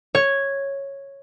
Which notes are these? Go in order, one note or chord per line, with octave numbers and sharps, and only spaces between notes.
C#5